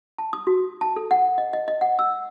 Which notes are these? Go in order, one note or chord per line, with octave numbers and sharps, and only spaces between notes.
A5
D#6
F#4
A5
A4
F#5
D#5
D#5
D#5
F#5
E6